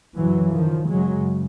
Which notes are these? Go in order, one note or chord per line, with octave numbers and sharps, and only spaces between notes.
F#2 C#3 E3 F#3
D#3 F3
F#2 C#3 F#3 G#3